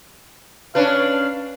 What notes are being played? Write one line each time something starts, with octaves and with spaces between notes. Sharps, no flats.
C#4 D4 B4 F5